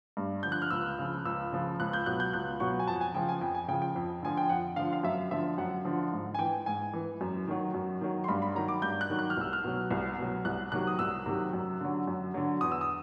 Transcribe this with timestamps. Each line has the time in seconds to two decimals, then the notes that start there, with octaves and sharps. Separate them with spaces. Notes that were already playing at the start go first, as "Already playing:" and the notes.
0.17 G2
0.43 D3 F3 G6
0.52 F#6
0.62 F6
0.70 C#2 E6
0.99 C#3 F3
1.25 C#2 E6
1.52 C#3 F3
1.80 C#2 F#6
1.93 G6
2.06 B2 F#3 F#6
2.20 G6
2.33 C#2 F#6
2.60 B2 F#3 C#6
2.79 G#5
2.87 F2 A5
3.01 G#5
3.14 C#3 F3 G5
3.29 G#5
3.41 F2 G5
3.55 G#5
3.68 C#3 G5
3.73 F3
3.82 G5
3.96 F2
4.22 D3 F3 G#5
4.37 G5
4.49 F2 F#5
4.76 D3 F3 F5
4.93 F5
5.03 F#2 E5
5.31 D3 F3 E5
5.58 F#2 F#5
5.85 D3 F3
6.12 G#2
6.34 G#5
6.39 E3 G5
6.66 G#2 G#5
6.94 E3
7.21 F#2
7.48 D#3 F#3
7.74 F#2
8.01 D#3 F#3
8.24 C6
8.28 G2 B5
8.42 B5
8.55 D#3 F#3 A#5
8.68 D6
8.82 G2 G6
9.01 F#6
9.10 D#3 F#3
9.19 F#6
9.30 F6
9.37 C2 E6
9.53 F6
9.64 B2 F#3
9.91 C2
10.18 B2 F#3
10.45 C2 F#6
10.72 C3 D#3 F#3 F#6
10.87 D#6
10.99 C2 E6
11.26 C3 D#3 F#3
11.53 F#2
11.80 D3 F#3
12.07 F#2
12.34 D3 F#3
12.61 E2 D#6
12.72 E6
12.81 D#6